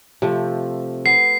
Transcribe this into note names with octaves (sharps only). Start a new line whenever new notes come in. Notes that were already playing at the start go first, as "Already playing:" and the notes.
C3 F3 A3
B3 C7